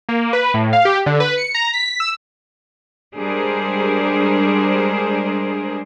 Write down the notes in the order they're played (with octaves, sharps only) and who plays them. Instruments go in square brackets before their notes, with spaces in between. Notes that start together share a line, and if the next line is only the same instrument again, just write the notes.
[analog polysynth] A#3
B4
A2
F5
G4
D3
B4
C#7
A#5
B6
E6
[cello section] G3 G#3 D4 G#4 A#4 C5